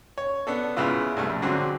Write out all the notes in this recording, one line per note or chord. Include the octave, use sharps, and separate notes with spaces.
C#5
B3 D4 A4
G#2 C#3 B3 E4 F4
C2 G2 A3
F2
G#2 D3 F#3 C4